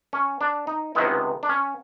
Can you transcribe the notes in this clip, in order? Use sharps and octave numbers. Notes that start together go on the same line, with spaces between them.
C#4
D4
D#4
C#2 C3 D#3 G#3 B3 E4
D4
C#4